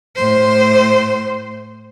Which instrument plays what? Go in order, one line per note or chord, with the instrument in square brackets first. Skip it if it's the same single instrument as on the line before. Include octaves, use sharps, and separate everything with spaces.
[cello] A2 C5